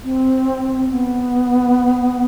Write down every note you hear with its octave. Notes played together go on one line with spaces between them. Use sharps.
C4
B3